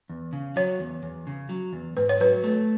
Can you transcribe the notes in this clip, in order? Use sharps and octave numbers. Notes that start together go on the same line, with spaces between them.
E2
C#3
F#3 C#5
E2
E2
C#3
F#3
E2
G#2 B4
C#5
F#3 B4
A3